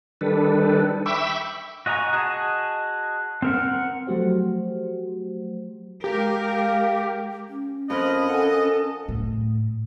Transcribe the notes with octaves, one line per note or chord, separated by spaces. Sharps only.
D#3 G3 D4 A4 B4
E5 G5 B5 C#6 D6 E6
F#4 D#5 G#5 A#5 C#6
F#4 G#4 D#5 G#5 A5
C4 A#4 F#5
F3 F#3 A3 F#4 G4 C5
G#3 G4 A#4 F5
C#4
F2 A#4 D#5 B5 F6
A4 F#5 G#5
A2